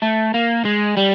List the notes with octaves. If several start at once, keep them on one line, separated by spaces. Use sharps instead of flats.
A3
A#3
G#3
G3